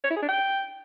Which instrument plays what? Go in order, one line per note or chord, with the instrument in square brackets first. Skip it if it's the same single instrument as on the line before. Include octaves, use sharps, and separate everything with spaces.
[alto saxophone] C#5
E4
G#4
D4
G5